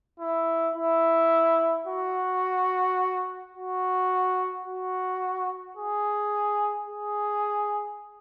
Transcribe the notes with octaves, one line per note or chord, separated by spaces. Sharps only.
E4
E4
F#4
F#4
F#4
G#4
G#4